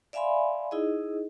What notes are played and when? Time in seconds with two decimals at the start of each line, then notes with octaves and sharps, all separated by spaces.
0.13 D5 E5 F5 G#5 B5 C6
0.71 D#4 E4 G#4 D#5